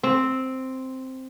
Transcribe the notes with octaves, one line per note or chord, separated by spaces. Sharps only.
C4